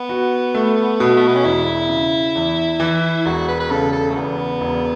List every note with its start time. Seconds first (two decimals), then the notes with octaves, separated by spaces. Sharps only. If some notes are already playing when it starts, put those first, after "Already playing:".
Already playing: B3
0.09 F#4
0.54 A3
1.00 B2
1.17 A3
1.27 B3
1.35 C#4
1.45 E1 E4
1.90 C#3
2.35 E2
2.80 E3
3.26 E1 F#4
3.48 B4
3.60 B4
3.71 C#3 A4
3.92 A4
4.10 A3
4.15 E2 B3
4.61 E1